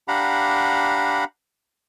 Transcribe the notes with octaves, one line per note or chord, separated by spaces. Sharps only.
D4 G4 F5 F#5 A#5 B5